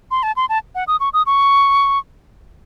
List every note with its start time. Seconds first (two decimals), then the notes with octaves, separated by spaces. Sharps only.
0.11 C6
0.23 A5
0.36 C6
0.49 A5
0.75 F#5
0.87 D#6
1.00 C#6
1.13 D#6
1.26 C#6